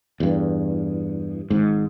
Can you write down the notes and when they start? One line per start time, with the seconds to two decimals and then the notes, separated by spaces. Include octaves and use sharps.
0.20 E2 G2
1.50 G#1 G#2